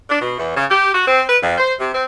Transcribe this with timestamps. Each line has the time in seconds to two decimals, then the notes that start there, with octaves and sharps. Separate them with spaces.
0.09 D4
0.20 B2
0.38 E2
0.55 C#3
0.69 G4
0.93 F#4
1.08 C4
1.27 B4
1.41 F2
1.57 C5
1.78 C3
1.94 C4